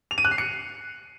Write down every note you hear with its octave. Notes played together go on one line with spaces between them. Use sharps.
F7
D#7
F#6
C7
C#7